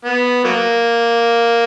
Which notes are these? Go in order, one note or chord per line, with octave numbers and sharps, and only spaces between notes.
B3
F#3 A#3